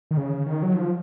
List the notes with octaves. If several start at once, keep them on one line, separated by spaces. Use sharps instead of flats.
D#3
C#3
D#3
F#3
F3